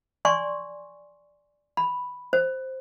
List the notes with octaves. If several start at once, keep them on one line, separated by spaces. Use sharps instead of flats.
D5 G#5 C6 C#6
B5
C5